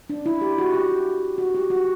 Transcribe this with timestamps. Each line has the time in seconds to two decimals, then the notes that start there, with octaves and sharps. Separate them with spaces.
0.10 D4
0.26 E4
0.41 G4
0.58 F#4
0.74 G4
1.38 F#4
1.55 G4
1.70 F#4